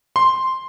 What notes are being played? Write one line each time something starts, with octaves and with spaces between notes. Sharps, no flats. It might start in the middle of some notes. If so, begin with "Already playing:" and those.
C6